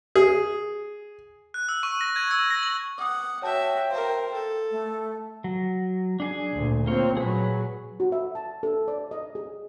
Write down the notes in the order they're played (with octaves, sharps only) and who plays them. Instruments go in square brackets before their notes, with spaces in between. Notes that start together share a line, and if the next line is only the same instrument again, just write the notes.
[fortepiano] G#4
[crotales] F#6
E6
C#6
A#6
G#6
E6
A#6
F#7
[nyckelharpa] F#5 [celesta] D6 D#6
[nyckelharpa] F#4 E5 [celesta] C#5 A5 [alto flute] G5
[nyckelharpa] A#4 C5 [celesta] F5
[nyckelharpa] A4
[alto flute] A3
[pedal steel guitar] F#3
D4 G#4 G#5
[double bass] D2 A#2
[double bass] A#3 C4 [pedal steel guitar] F4 C#5
[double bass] A#2 F#3 [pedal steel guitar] G#4 B4
[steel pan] F#4
E5
A5
A4
D5
D#5
G#4